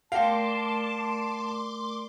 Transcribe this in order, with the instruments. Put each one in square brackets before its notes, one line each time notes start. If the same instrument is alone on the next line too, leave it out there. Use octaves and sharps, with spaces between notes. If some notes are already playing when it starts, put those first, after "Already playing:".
[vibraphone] A3 A#4 D5 [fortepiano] F5 G5 [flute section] A5 [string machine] C6 D6